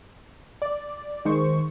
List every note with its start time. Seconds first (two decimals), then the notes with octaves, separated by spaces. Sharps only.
0.62 D5
1.25 D#3 G#3 C5 C#6